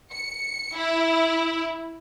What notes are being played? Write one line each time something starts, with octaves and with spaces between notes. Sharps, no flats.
C#7
E4